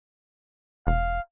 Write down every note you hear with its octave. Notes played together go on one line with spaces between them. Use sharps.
E1 F5